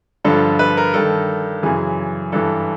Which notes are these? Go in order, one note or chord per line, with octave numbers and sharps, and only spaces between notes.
G2 D3 F3 A4
B4
A#4
G2 D#3 A4
F#2 C#3 E3 G#4
G2 E3 A4